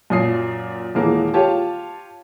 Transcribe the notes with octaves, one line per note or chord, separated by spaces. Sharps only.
F#2 A#2 D#6 C7
D#1 E3 G#3 A#3 A#4
F4 G4 C#5 A5